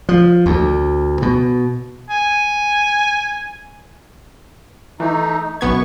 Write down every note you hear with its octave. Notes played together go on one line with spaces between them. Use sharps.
F3
D2
B2
G#5
E3 A3 D#4
B1 F#2 B3 C#6 G#6